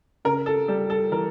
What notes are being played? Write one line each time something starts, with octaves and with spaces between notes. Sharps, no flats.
C#3 A#4
A4
G3 A4
A4
E3 A#4